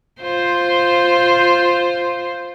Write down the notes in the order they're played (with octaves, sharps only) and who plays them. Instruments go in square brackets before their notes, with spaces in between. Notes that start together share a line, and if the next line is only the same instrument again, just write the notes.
[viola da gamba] F4 C5